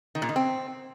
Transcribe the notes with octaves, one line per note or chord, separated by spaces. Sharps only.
D#3
A#2
D#3
C4